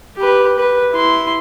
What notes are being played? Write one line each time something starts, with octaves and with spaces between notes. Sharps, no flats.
G4 B4
B4
E4 C6